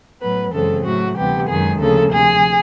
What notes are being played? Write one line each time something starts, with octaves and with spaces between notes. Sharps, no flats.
A2 F#3 B3 B4
F#2 C#3 E3 G#3 C4 A4
A2 F#3 A3 F#4
D2 C3 E3 G3 B3 G4
F#2 D#3 G#3 G#4
D2 C#3 F3 A#3 A4
D2 C3 F3 G#4